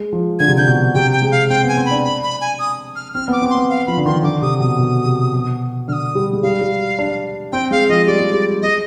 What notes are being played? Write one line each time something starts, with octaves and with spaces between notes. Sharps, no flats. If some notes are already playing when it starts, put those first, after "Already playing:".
Already playing: G#3
F3
D3 G#6
C3
D3 G6
B2
C3 G5
G5
G#3
F5
C4 G5
B3
G#5
C4
B5
D4
B5
B5
G#5
D#6
F6
C4 F6
B3 D6
C4
B3 C6
F5
F3 B5
D3
D#3 C6
D3 D6
C3 D#6
B2 D#6
B2
C3
B2
D3 D#6 F6
G3
G#3
G3 F5
G3
D4
C4 G5
G#3 F5
F3 D#5
G3 D5
G#3
G3
G#3 D#5